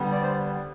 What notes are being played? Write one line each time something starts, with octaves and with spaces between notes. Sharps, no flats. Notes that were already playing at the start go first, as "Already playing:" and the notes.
Already playing: D3 G3 B3
D5
C5